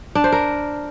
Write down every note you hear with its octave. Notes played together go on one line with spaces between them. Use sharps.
D4
C5
A#4